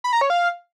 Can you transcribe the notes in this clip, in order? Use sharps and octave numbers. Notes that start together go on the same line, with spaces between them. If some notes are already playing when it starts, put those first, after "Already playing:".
B5
A#5
C#5
F5